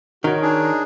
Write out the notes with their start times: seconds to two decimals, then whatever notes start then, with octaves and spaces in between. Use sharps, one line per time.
0.24 D#3 F#4 A#4 C#5
0.42 D4 D#4 G#4